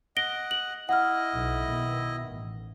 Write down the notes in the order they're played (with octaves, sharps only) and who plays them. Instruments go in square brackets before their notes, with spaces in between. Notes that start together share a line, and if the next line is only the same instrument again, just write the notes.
[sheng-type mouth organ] D#5 F#5 [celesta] A#6 D7 G7
[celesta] F#7
[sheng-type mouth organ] E4 D#5 [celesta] F#5 F6
[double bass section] B1
B2 D#3 B3
A1